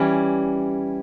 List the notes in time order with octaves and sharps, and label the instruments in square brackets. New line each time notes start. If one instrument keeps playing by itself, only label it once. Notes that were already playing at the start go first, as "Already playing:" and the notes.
Already playing: [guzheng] E3 G3 C#4